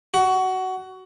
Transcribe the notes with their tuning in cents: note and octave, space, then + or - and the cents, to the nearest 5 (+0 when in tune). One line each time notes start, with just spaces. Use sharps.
F#4 +20